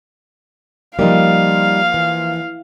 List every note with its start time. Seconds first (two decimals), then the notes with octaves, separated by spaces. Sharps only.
0.99 F3 G3 A#3 D#4 F5
1.94 E3